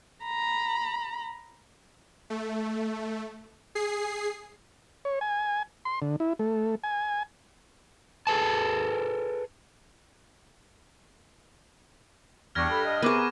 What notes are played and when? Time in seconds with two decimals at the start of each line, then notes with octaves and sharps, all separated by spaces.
0.25 A#5 B5
2.30 A3
3.75 G#4 C7
5.05 C#5
5.21 G#5
5.85 C6
6.02 D3
6.20 E4
6.39 A3
6.84 G#5
8.27 G#4 A4 B4 A5
12.55 E2 G2 G3 C#6 F6 G#6 A#6
12.69 A4 B5
12.85 D#5
13.02 C3 B3 G#4 A#4 C#6 D6 D#7